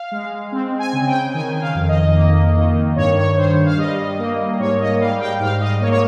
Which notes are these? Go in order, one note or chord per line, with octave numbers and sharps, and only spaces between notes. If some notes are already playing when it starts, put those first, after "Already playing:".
Already playing: F5
G#3
C4
G#5
C#3
G5
D#3 G#5
F5
F2
D#5
A#3
D#3
G2 C#5
C#5
G2 C5
F5
G3 D#5
A#3
G#2 C#5
D#5
G3 F5
G5
G#2 F5
D#5
A#3 C#5
C#5